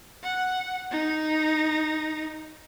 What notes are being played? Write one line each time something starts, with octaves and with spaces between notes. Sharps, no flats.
F#5
D#4